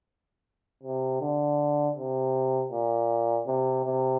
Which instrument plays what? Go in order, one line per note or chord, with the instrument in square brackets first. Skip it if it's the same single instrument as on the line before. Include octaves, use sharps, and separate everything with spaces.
[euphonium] C3
D3
C3
A#2
C3
C3